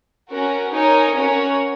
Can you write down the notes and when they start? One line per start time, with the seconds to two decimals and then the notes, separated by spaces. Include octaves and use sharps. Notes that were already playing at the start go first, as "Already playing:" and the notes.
0.31 C#4 F#4 A#4
0.74 D#4 A#4 C#5 G#5
1.16 C#4 F#4 A#4 C#5